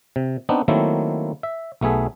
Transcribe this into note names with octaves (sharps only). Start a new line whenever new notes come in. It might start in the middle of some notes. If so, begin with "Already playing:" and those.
C3
B3 C4 D4 D#4
D#3 F#3 A3 A#3 C4 E4
E5
B1 A3 B3 G#4 E5